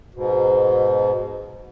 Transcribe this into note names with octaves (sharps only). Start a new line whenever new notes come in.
G#2 B2